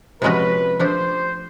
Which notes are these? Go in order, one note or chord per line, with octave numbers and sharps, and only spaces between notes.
C3 F3 G#3 C#4 F#4 B4
F3 A3 D4 G4 C5